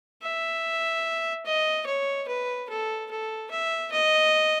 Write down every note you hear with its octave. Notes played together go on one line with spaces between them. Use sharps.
E5
D#5
C#5
B4
A4
A4
E5
D#5